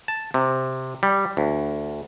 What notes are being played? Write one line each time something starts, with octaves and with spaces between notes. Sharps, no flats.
A5
C3
G3
D2